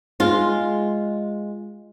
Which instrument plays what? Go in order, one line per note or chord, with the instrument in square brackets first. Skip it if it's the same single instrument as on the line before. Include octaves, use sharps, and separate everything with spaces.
[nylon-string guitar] G#3 F4